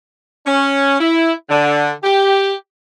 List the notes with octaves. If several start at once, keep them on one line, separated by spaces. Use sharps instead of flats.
C#4
E4
D3
G4